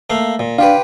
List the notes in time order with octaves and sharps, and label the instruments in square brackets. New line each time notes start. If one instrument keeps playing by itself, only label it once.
[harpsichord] A3 A#3 F5
A#2
[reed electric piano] D4 F5 [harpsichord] F4 G4 B4